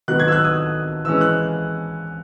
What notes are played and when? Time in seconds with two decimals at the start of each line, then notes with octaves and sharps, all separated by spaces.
0.08 D#3 F#3 B3 F#6
0.20 G#6
0.28 E6
0.32 F#6
0.44 D#6
1.05 E3 G#3 C#4 E6
1.21 F#6